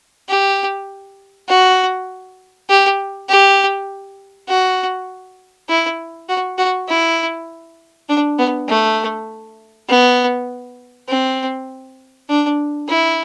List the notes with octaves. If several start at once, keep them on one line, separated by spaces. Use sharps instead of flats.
G4
F#4
G4
G4
F#4
E4
F#4
F#4
E4
D4
B3
A3
B3
C4
D4
E4